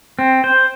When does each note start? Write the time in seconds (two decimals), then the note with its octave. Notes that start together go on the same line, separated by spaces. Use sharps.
0.19 C4
0.44 C5